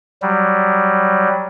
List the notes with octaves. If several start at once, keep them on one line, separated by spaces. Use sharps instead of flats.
F#3 G3